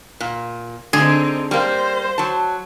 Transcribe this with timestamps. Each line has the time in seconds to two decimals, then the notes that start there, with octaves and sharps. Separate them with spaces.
0.20 A#2
0.93 D3 C4 D#4 G#4
1.51 G3 A#3 C5
2.18 F#3 A5